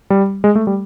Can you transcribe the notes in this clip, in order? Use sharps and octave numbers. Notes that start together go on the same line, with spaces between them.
G3
G#3
A3
G3